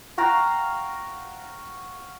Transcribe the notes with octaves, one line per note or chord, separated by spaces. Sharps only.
F#4 F5 G5 A#5